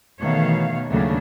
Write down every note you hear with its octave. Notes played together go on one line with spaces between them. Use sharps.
B2 D#3 E3 A3 C#5 F5
D#2 A2 C#3 F#3 A3 D4